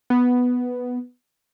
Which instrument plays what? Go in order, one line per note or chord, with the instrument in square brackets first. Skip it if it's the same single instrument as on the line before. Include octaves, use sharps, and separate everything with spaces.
[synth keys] B3